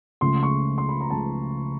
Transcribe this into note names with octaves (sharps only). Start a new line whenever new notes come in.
C#2 C#3 F3 A3 C6
C#6
C6
B5
A#5
C#2 C#3 F3 A3 A5